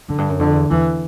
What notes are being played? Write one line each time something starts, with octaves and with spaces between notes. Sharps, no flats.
F#2 D3
G2
F#2
F2 D3
E2
E2 E3